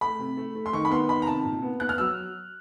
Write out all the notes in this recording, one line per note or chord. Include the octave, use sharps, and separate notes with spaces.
A3 B5
C3
A3
A3
C6
D#3 C#6
B5
B3 C6
D#3 B5
A#5
C3 A5
A#2
B3
B3 F#6
F6
F#3 E6